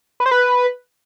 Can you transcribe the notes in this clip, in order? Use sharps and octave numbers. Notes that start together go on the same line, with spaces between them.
B4
C5
B4